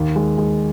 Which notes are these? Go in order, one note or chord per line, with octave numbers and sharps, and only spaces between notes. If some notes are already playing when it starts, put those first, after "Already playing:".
Already playing: D#2
G#3
G#3